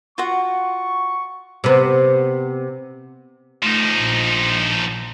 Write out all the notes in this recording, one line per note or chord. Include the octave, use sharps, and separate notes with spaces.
F4 F#4 F#5 C#6
C3 B3
F3 A3 D#4
A#1